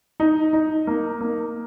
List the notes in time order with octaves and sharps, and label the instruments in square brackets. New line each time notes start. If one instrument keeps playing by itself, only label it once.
[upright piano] D#4
D#4
A#3
A#3